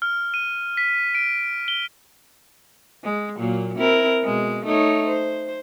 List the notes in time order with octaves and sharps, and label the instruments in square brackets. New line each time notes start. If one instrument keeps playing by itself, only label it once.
[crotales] F6
D#7
B6
D7
G7
[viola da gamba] G#3
A#2 F#3 A#3
C4 E4 A#4
B2 G#3
A3 D#4 C#5
C5